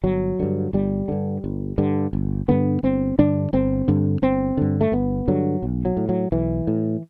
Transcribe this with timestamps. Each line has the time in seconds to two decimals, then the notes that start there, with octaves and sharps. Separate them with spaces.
0.03 G1 F#3
0.39 G2 D3
0.73 G1 G3
1.08 G2 D3
1.44 G1
1.78 G2 D3
2.13 G1
2.48 G2 D3 B3
2.83 G1 C4
3.19 G2 D3 D4
3.53 G1 C4
3.88 G2 D3
4.22 G1 C4
4.57 G2 D3
4.81 A3
4.92 G1 B3
5.28 G2 D3 F#3
5.62 B1
5.85 F#3
5.97 A2
6.09 F#3
6.32 B1 E3
6.67 A2